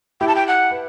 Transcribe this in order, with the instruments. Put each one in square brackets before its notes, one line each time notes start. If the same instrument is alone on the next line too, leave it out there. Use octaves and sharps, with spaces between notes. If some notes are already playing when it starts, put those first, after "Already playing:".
[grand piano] E4 G4 [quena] G5
[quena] A5
G5
F#5
[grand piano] B4